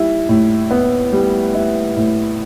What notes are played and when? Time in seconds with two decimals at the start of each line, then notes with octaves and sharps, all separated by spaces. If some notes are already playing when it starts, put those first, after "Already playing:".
Already playing: G3 E4
0.29 A2
0.71 B3
1.12 G3
1.54 E4
1.96 A2